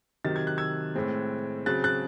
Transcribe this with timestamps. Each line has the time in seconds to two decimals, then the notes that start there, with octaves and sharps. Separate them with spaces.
0.25 C3 D#3 F#3 A6
0.36 G#6
0.47 F#6
0.58 E6 G#6
0.95 A2 G#3 C4
1.66 C#3 F#3 C4 F#6 A6
1.84 F#6 A6